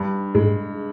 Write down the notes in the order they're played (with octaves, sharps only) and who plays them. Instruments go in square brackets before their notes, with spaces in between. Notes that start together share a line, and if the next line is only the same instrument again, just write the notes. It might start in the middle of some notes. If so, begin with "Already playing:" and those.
Already playing: [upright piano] G2
[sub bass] G#2 [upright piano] G#3